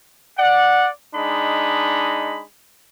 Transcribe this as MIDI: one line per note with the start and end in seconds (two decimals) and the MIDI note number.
0.39 0.89 74
0.39 0.89 78
1.15 2.44 56
1.15 2.44 62
1.15 2.44 63
1.15 2.44 83